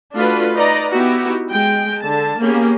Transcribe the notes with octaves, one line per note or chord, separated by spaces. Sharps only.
A3 D4 F4 F#4 B4
D#4 B4 D5 D#5 A#5
B3 D#4 E4 F#4 G4
G#3 G5
D3 A5
A#3 B3 C#4 G4 G#4